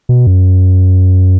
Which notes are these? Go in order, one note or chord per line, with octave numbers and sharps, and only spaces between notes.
B2
F#2